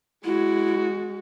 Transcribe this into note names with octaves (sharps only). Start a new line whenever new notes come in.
G#3 E4 F#4